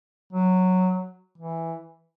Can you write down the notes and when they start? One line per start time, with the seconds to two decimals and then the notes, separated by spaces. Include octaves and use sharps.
0.33 F#3
1.38 E3